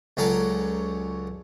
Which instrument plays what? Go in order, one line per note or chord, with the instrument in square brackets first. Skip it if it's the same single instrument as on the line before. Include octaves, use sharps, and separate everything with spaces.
[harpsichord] C#2 F#3 C#4 A4 D5 A#5